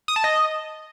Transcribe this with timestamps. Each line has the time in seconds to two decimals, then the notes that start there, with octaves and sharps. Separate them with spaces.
0.08 D#6
0.16 A5
0.24 D#5